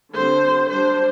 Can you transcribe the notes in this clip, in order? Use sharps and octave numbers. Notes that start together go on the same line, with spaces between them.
D3 G3 C4 C5
G3 D4 C5